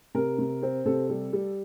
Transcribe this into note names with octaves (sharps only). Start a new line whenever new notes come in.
C3 A#4
C3
C4
C3 A4
G3
G3